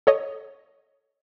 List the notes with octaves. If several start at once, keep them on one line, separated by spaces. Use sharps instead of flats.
A4 C#5 D#5